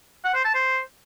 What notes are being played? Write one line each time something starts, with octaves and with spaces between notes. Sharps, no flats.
F#5
C5
A5
C5